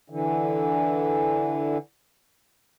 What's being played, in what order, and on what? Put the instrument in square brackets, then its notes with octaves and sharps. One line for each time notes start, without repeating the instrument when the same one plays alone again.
[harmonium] D3 E3